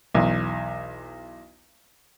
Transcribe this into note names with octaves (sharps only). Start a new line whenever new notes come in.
B1 E2